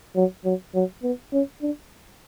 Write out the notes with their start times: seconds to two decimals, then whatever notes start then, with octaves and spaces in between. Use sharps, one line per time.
0.16 F#3
0.45 F#3
0.74 F#3
1.03 B3
1.33 C#4
1.62 D4